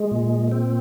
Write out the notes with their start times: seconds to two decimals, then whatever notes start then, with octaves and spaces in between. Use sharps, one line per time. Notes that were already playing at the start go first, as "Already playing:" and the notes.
Already playing: G#3
0.11 A#2
0.52 C4